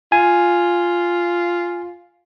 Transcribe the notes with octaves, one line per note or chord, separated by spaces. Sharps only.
F4 G#5